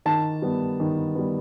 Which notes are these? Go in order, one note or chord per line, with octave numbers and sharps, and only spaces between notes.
D#3 A5
G3 B3
D#3
G3 B3